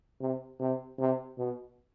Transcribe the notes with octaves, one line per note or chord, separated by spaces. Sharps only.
C3
C3
C3
B2